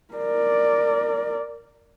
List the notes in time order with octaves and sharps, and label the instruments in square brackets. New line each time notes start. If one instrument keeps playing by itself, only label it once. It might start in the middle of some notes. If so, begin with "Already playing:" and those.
[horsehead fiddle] A#4 D5